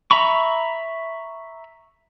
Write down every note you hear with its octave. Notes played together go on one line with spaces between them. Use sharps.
E5 A#5 B5 C#6